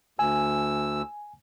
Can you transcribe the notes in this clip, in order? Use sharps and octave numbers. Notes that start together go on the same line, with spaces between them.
D2 G#5 E6